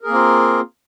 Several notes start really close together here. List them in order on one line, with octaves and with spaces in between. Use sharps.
A#4 G#4 A#3 C4 F4